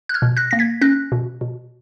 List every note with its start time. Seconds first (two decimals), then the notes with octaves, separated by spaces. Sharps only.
0.09 F#6
0.14 F6 G#6
0.22 B2
0.37 F#6 A#6
0.51 A#3 A#6
0.59 G#6 B6
0.81 C#4 F#6 A#6
1.12 B2
1.41 B2